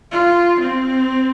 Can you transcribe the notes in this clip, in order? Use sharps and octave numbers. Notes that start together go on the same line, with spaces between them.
F4
C4